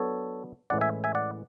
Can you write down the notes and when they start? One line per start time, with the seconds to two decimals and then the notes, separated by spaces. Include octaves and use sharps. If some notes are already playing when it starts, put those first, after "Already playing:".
Already playing: F#3 B3 D4 A4 C#5
0.70 A2 E3 G#3 C#4 E4 D5 F#5
0.81 E5 G#5
1.04 E5 G#5
1.15 D5 F#5